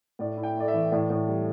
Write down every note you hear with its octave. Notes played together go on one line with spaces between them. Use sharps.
A2 D5
E4
G5
A3 D5
E5
E3
A2 D5
A2
G3